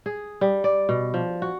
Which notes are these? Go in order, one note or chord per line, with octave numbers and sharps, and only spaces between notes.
G#4
G3
D5
B2
F3
F#4